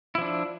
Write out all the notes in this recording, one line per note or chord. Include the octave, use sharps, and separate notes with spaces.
F3 D4 E4